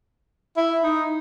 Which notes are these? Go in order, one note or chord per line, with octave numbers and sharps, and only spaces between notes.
E4
D#4